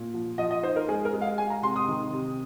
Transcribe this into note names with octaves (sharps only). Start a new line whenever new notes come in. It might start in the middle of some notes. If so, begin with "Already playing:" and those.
Already playing: A#2
F3
F3 D#5
D#5
D#4 C5
A#4
G#3 G#4
A#4
G#3
F5
G#3 G#5
A#5
C3 C6
D#6
D#3
C3